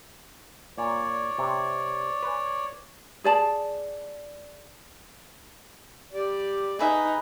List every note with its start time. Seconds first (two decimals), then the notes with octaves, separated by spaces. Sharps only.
0.78 A#2 C#5 D5
1.38 C3
2.23 B4 G#5
3.24 G#4 D5 A5
6.13 G4 D5
6.79 D#4 G#4 B4 E5